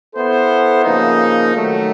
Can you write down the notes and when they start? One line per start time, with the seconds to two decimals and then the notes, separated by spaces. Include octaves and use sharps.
0.14 B3 E4 A4 C5
0.85 C#3 F3 A#3 D#4
1.55 D#3 F#3 A3